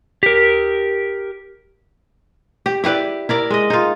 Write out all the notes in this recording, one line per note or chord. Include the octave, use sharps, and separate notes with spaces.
G4 A#4
G4
E4 G4 B4 D5
E4 A#4 D5
G#3 D#5
D#4 F4